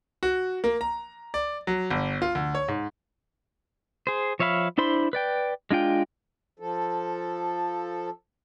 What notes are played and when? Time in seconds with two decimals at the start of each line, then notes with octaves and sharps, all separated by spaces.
0.23 F#4
0.64 A#3
0.81 A#5
1.34 D5
1.67 F#3
1.91 G1
2.22 F4
2.35 D2
2.55 C#5
2.68 G#2
4.07 G#4 C5
4.40 F3 C#5 E5 F5 B5
4.78 D4 E4 C5 B5 C6
5.13 B4 D5 G5
5.71 G#3 D4 F4 G5
6.59 F3 A4